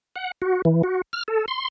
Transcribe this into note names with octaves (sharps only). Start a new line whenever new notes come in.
F#5
F#4
E3
F#4
F6
A4
C6